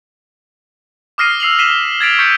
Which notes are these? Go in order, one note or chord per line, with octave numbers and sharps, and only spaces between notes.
D6 D#6 F6 A#6 C7 D#7
E6 C7 F7 F#7
B6 C7 D#7 E7 G7
G#6 A6 B6 D7 F7
C#6 G6 A6 B6 C#7